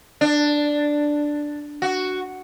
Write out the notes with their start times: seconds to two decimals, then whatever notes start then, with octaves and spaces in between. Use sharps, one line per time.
0.21 D4
1.82 F#4